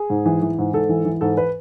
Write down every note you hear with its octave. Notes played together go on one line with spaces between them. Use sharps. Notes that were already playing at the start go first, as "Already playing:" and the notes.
Already playing: G#4
G#2
E3
E3
G#2
G#2 A4
E3
E3
G#2 A4
B4